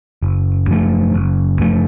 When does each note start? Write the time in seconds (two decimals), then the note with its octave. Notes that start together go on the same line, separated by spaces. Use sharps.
0.22 F#1
0.68 F#2 F3 A3
1.14 F#1
1.59 F#2 F3 A3